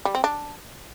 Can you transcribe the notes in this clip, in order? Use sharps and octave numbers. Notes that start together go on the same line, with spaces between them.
G3
C4
D4